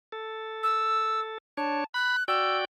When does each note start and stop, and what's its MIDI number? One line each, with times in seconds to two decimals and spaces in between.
0.12 1.38 69
0.63 1.20 88
1.57 1.84 62
1.57 1.84 73
1.57 1.85 81
1.94 2.16 83
1.94 2.23 90
2.28 2.65 66
2.28 2.65 74
2.28 2.65 79
2.28 2.57 88